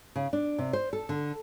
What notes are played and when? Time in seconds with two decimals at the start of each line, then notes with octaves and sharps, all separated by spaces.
0.16 C#3
0.33 D4
0.58 C3
0.73 C5
0.93 A4
1.09 D3